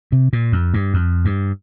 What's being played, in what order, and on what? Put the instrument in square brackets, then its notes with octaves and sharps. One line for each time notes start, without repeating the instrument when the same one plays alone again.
[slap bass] C3
A#2
F2
G2
F2
G2